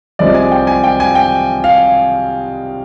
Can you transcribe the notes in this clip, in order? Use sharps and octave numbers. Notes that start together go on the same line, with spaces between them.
C2 C3 F3 G#3 D5
G#5
G5
G#5
G5
G#5
G5
F5